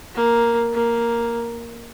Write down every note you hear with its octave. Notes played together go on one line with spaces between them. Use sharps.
A#3
A#3